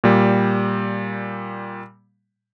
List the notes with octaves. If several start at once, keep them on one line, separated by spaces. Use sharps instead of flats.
A#2 G3